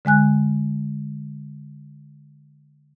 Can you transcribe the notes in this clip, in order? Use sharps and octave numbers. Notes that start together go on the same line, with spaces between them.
D3 G#3 G#5 F#6